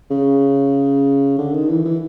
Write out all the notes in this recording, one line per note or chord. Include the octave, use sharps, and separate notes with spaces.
C#3
D3
D#3
E3
E3